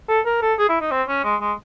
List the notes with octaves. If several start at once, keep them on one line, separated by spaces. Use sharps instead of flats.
A4
A#4
A4
G#4
E4
D#4
C4
C#4
G#3
G#3